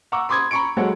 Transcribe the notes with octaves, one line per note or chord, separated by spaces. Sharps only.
F#5 A#5 C#6 D6 E6
B5 C6 D6 D#6 G#6
A#5 B5 C#6 C#7 D7
F#3 G#3 A4 C#5 F#5